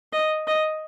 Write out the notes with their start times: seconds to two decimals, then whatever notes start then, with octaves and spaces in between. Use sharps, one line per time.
0.13 D#5
0.47 D#5